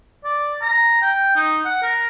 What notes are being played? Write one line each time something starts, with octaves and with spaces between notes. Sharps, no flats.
D5
A#5
G5
D#4
F#5
A#4